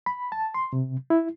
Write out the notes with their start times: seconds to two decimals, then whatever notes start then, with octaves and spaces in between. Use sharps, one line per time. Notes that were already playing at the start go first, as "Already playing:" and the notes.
0.06 B5
0.32 A5
0.54 C6
0.73 C3
1.10 E4